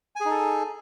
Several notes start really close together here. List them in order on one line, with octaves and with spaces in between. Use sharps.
G#5 G#4 D#4 A4